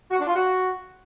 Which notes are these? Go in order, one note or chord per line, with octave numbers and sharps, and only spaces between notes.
F#4
D4
F4
F#4